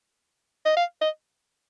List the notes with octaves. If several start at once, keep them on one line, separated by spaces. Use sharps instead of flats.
D#5
F5
D#5